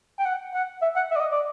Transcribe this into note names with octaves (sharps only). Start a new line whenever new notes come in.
G5
F#5
F#5
E5
F#5
E5
D5
D#5
D5